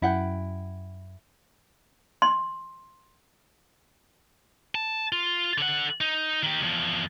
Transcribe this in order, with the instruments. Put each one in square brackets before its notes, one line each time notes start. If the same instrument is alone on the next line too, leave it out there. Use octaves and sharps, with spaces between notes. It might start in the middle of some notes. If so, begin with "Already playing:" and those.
[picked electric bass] F#2 [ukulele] E4 F#5 G5
[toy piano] C6
[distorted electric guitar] A5
F4
D3 F#5
D#4
D#3 G4
E2 F3